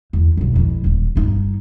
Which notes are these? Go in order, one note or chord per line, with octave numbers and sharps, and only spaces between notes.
E2
B1 F2
F2 E3
D#1 A#2
G1 D#4